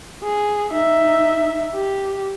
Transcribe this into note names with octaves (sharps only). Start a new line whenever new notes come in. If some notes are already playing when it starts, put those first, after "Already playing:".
G#4
D#4 E5
G4